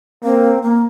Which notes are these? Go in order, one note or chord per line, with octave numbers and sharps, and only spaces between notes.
A#3 C4
A#3